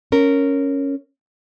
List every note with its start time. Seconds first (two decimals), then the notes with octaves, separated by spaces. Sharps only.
0.12 C#4 A#4